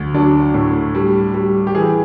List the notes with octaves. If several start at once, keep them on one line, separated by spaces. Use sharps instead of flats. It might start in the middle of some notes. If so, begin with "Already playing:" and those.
Already playing: D2
F#3 D4
A2
G3
G3
G4
E3 G#4